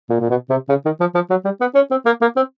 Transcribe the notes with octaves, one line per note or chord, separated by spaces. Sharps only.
A#2
A#2
B2
C3
C#3
D#3
F3
F3
F#3
G3
B3
C#4
C4
A#3
A#3
C4